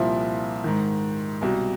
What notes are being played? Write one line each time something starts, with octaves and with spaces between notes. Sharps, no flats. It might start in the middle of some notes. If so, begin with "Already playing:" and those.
Already playing: C2 A#2 F3 E4
G#2 D#3
C2 B2